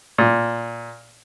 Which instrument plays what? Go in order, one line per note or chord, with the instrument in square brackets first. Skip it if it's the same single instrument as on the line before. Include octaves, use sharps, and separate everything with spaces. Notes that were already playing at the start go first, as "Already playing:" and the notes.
[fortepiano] A#2